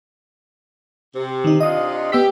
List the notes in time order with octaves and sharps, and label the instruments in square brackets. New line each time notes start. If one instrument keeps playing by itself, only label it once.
[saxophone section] C3
[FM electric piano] D#3 D#4
[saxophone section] C3 D4 F4 [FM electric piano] D#5 D#6
[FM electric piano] B3 E6 B6 [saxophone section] G4